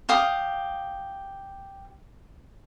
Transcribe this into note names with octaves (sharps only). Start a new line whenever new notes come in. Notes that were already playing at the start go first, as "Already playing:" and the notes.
G4 F5 D#6